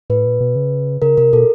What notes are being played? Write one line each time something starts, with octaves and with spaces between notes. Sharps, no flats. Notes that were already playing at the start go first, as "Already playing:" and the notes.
A2 B4
A#2
B2
C#3
C#3 A#4
C3 A#4
B2 A4